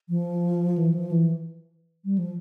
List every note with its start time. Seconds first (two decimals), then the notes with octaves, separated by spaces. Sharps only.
0.09 F3
0.78 E3
0.94 F3
1.11 E3
2.05 G3
2.18 F3